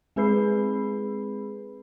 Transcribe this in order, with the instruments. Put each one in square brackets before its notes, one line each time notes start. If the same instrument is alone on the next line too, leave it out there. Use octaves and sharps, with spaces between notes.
[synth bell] G#3 C4 G#4 B4 B5 C7